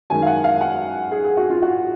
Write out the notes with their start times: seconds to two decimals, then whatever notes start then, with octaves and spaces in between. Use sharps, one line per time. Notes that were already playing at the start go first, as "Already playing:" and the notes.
0.10 F#2 D#3 G#3 G#5
0.22 F5
0.26 F#5
0.44 F5
0.61 F#5
1.11 G#4
1.24 G#4
1.37 F#4
1.50 F4
1.62 F#4